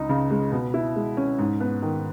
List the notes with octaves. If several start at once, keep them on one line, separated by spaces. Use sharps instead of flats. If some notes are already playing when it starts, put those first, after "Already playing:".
Already playing: C#2 D#4
C#3
G#3
B2
E4
G#3
C#4
G#2
B3
D#3